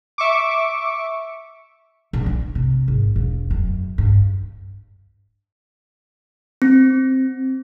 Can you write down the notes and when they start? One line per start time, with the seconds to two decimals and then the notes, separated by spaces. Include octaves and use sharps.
0.18 E5 C#6 D6
2.13 A#1
2.26 D4
2.55 C3
2.88 G#1
3.16 E1
3.50 F#2
3.98 G2
6.62 C4